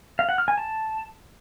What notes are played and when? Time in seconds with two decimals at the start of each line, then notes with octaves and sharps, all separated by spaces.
0.19 F5
0.29 F#5
0.38 F6
0.48 G#5
0.58 A5